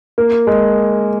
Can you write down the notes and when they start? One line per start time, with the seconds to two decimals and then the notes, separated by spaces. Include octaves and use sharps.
0.18 A#3
0.47 G#3